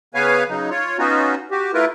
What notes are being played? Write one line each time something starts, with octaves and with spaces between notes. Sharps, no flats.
C#3 B3 B4 C#5 F5 G#5
C#3 F#3 D#4
F4 C#5
B3 C#4 D#4 F4 F#4
F#4 G4
A3 E4 F4 A#4 B4